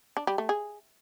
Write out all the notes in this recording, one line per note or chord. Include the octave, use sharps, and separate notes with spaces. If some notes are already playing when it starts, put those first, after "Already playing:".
D4
G3
A3
G#4